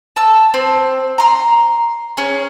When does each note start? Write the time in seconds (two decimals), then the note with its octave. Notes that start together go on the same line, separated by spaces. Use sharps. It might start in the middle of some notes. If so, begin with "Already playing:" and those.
0.16 A5 E6
0.54 C4
1.18 A#5 C6
2.17 C#4 G#4